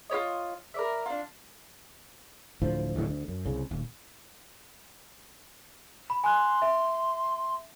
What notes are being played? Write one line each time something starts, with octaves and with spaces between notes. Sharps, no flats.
F4 G4 C#5 D#5
A#4 D5 E5
D4 F4
D1 D2 A2 F3
D1 A2
D2
F#2
C2 C#3
D#1
B5
G#5 C6 F#6
E5